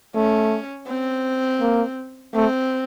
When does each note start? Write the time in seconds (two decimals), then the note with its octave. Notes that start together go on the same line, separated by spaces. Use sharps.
0.15 A3 C#4
0.88 C4
1.61 A#3
2.35 A3 C4